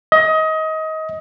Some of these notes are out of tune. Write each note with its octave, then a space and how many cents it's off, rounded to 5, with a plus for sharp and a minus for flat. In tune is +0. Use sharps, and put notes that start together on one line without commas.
D#5 +25